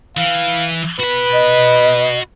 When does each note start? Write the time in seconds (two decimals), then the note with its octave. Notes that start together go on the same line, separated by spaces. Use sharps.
0.17 E3 F5
0.99 F#4 B4 B5
1.33 D#5